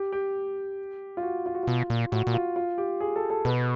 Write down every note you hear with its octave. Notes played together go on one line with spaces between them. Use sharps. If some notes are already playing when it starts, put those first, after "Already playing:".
Already playing: G4
G4
F4
F#4
F4
F#4
B2 F4
A#2
A2 F#4
A#2
F4
F4
G4
G#4
A4
A4
B2 B4